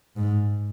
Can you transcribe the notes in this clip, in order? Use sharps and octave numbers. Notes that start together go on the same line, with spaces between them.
G#2